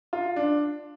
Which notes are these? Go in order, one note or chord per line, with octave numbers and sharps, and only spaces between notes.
F4
D4